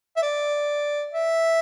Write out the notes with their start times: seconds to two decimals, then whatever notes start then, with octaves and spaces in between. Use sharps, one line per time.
0.16 E5
0.22 D5
1.14 E5